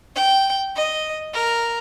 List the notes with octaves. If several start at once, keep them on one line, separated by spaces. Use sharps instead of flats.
G5
D#5
A#4